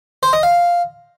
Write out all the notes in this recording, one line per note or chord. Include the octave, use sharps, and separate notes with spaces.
C5
D#5
F5